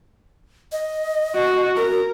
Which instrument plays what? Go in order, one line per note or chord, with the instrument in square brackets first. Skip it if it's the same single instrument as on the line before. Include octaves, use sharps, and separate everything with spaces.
[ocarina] D#5
[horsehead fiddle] F#4
[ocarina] F#4 [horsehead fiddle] A#4